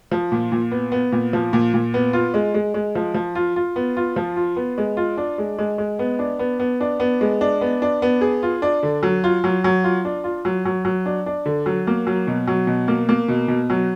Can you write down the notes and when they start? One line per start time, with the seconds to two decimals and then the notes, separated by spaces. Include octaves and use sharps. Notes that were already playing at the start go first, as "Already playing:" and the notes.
0.12 F3
0.32 A#2
0.52 A#2
0.71 B3
0.92 B3
1.12 A#2
1.33 F3
1.53 A#2
1.74 A#2
1.94 B3
2.13 F4
2.34 G#3
2.54 G#3
2.74 G#3
2.95 F3
3.14 F3
3.35 F4
3.56 F4
3.76 B3
3.97 F4
4.16 F3
4.36 F4
4.56 B3
4.78 G#3
4.97 F4
5.17 D4
5.38 G#3
5.59 G#3
5.78 G#3
5.99 B3
6.19 D4
6.39 B3
6.59 B3
6.81 D4
7.00 B3
7.21 G#3
7.41 D4
7.61 B3
7.82 D4
8.02 B3
8.21 G#4
8.43 F4
8.62 D4
8.83 D3
9.03 F#3
9.24 F4
9.44 F#3
9.64 F#3
9.84 F4
10.05 D4
10.24 F4
10.45 F#3
10.65 F#3
10.85 F#3
11.06 D4
11.26 D4
11.46 D3
11.66 F#3
11.87 A#3
12.07 F#3
12.27 B2
12.47 F#3
12.67 B2
12.88 A#3
13.09 A#3
13.28 B2
13.48 B2
13.70 F#3